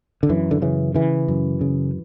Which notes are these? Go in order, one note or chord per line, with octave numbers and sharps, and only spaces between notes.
D3
F#2 E3
D3
C#3 E3
C#3 E3
F#2
C#3